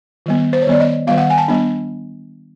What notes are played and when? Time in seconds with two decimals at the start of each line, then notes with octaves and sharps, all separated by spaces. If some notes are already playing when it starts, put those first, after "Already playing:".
0.26 D#3 G3 B3
0.53 C5
0.62 C#5
0.67 D#3 G3 B3 D5
0.80 D#5
1.07 D#3 G3 B3 F5
1.18 F#5
1.30 G#5
1.38 A5
1.48 G3 B3 D4